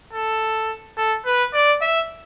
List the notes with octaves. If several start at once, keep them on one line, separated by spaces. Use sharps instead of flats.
A4
A4
B4
D5
E5